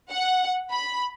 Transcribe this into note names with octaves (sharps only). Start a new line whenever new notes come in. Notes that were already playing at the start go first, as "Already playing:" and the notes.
F#5
B5